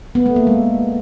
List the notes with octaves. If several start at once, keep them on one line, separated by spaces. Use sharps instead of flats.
B3
A3
A#3
G#3